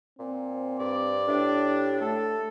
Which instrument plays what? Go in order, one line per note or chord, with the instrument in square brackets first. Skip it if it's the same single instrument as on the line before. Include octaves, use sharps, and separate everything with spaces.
[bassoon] A#2 [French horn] C4
[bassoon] G2 [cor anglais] D5
[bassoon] A2 [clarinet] D4 [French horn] G4
[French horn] A3 [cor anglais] A4